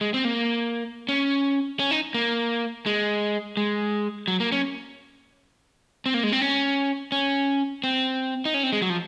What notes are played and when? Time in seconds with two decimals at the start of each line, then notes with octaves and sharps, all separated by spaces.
0.01 G#3
0.14 C4
0.25 A#3
1.09 C#4
1.79 C#4
1.91 D#4
2.14 A#3
2.86 G#3
3.57 G#3
4.28 F#3
4.40 A#3
4.52 C#4
6.06 C4
6.14 A#3
6.23 G#3
6.32 C4
6.41 C#4
7.12 C#4
7.84 C4
8.45 D#4
8.54 C#4
8.63 C4
8.73 G#3
8.82 F#3
8.90 F3